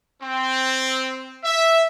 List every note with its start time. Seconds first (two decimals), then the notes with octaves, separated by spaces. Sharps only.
0.21 C4
1.44 E5